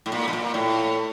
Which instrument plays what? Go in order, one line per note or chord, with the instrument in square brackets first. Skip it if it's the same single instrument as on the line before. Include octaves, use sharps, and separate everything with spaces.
[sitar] A2
A#2
B2
A#2
A2